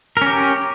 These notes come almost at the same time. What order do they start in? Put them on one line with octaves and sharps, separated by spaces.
A#4 C#4 G4